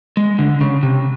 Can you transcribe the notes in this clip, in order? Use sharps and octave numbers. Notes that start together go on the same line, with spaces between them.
G#3
D3
C#3
C3